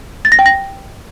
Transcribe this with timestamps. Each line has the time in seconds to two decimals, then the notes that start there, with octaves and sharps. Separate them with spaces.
0.25 A6
0.32 A#6
0.39 G5
0.46 A#6